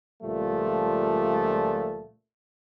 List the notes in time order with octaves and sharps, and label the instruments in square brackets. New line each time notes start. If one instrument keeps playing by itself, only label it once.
[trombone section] C#2 A#2 F3 G3 A3